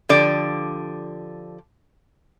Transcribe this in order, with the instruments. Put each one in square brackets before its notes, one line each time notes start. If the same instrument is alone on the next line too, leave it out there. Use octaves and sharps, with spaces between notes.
[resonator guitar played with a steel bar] D3 F3 G4 D5